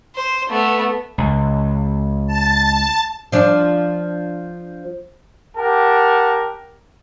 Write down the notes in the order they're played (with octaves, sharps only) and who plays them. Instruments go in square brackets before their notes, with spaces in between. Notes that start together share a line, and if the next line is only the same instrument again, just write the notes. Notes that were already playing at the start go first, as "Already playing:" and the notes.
[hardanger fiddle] C5
A3 B3
[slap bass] C#2
[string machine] A5
[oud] F3 D4
[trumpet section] G4 A#4 F#5 A5